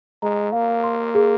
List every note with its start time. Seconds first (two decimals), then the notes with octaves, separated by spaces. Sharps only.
0.22 G#3 A#5
0.53 A#3 F5
0.84 C6
1.15 G#4